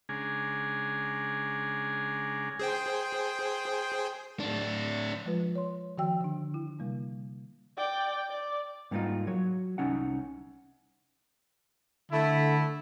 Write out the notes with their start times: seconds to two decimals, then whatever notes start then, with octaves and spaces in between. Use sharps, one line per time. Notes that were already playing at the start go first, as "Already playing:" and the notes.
0.09 C#3 G#3 D4 G#4 G#5 A#5
2.60 G#4 C5 G5
4.40 A2 D4
5.26 F3 G#3 F4 B4
5.55 C#5 C6
5.98 D#3 F3 F#4 G5 E6
6.21 D3 D4
6.54 E4
6.79 C3 G3 A#3
7.77 D5 G5
8.29 D5
8.91 G#2 G3 A#3 D4 D#4 F4
9.27 F#3 C#5
9.78 C2 C#4 D#4 F#5
12.11 D3 A3 E4